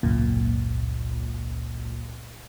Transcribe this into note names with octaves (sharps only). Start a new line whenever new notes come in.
G#1 C#2 F#2 A#2